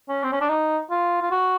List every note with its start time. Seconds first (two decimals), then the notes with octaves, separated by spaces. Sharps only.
0.09 C#4
0.24 C4
0.32 C#4
0.41 D4
0.49 D#4
0.91 F4
1.22 F4
1.31 F#4